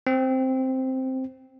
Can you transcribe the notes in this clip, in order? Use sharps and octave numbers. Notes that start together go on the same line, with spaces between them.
C4